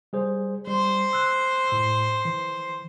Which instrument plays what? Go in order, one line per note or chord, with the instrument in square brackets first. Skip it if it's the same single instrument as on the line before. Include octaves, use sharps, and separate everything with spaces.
[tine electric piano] G3 G#4 C5
[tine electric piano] G3 [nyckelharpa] C5
[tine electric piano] E6 F#6
A2
E3